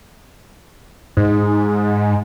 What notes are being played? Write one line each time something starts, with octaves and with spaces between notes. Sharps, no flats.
G#2